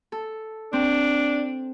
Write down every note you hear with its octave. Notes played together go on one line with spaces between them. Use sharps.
A4
C4 D4